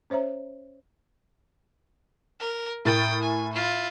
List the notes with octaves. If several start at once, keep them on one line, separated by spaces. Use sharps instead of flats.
C#4 C5 C#5 E5 A#5
A#4
A2 A#4 G5 D#6 A6
G#5
E4 F4